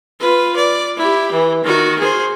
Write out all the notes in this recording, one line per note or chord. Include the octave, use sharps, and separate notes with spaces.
F4 B4
D5
E4 G4
E3
D#3 F#4
G#4 C5